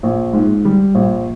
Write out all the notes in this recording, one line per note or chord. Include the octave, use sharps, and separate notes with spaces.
A#1
G#2
G3
A#1